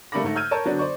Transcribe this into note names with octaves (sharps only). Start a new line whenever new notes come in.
G3 A3 A#3 B5 D6 A#6
G#2 A3
E6 F6 G6 G#6 D#7
A#4 C#5 A5
D3 F#3 B3 D4
C5 D5 C#6